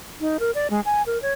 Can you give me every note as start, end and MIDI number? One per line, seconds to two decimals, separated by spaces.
0.20 0.37 63
0.40 0.51 70
0.55 0.68 74
0.70 0.80 56
0.85 1.02 80
1.06 1.20 70
1.22 1.33 73